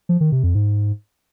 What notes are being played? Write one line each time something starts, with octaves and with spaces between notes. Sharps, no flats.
F3
D#3
C3
F2
G#2